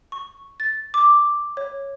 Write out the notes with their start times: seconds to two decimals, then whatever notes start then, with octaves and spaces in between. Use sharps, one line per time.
0.12 C#6
0.60 A6
0.94 D6
1.57 C#5